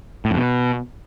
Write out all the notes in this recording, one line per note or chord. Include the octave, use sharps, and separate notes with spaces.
A2
F2
B2